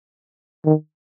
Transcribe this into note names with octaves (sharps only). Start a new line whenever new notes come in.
D#3